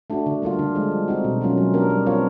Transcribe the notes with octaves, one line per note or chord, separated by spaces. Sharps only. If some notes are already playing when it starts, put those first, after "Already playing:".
A3 D4 F#4
D3
G3 A#3 D4 F4
D3
F3 G#3
G3
C4 D#4 F#4
B2
F#3 A#3 C#4 F4
F#3
B3 D4 G4 A#4
G3
C4 F4 A#4 C#5